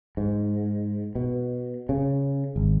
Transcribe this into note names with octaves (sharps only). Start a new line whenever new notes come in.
G#2
B2
C#3
G#1